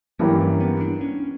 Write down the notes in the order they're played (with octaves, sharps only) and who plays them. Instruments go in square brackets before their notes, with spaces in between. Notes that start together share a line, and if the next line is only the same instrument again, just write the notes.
[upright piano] G2 E3 A#3 C#4 G4 [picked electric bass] F#3
[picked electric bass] G3
B3
D4
C#4